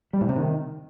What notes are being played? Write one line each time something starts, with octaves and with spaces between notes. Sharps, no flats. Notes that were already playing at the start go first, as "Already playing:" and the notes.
G3
A2
C3
D#3